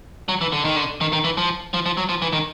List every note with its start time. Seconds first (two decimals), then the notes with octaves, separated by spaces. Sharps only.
0.29 F#3
0.41 E3
0.52 D3
0.65 D#3
0.76 D3
1.01 D#3
1.13 D#3
1.24 E3
1.37 F3
1.74 F3
1.86 F3
1.97 F#3
2.09 F3
2.22 E3
2.33 D#3